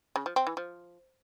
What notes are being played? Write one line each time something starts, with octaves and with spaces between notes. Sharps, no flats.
C#3
F3
C4
E3
F3